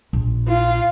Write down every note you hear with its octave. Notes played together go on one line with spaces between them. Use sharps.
A#1
F4